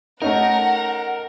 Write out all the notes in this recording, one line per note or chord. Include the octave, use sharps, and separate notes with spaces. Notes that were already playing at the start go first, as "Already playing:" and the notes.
A3 C#4 D#4 A#4 F#5 A#5